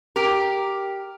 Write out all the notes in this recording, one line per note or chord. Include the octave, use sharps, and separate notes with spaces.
G4 A#4